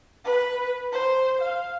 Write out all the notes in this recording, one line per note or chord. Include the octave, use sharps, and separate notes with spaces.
B4
C5
F5